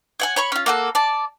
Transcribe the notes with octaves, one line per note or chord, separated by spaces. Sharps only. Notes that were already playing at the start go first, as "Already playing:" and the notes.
C#5 F#5 G#5
C#5 B5 C#6
C#4 F4
A#3 F#4 A4
D5 A5